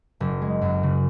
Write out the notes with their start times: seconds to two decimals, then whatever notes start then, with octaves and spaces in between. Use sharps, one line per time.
0.20 F#1
0.42 G#3
0.61 F#2
0.83 C#3